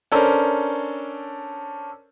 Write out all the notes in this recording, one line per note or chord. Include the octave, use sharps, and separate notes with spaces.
C#4 D4 A4 A#4 C5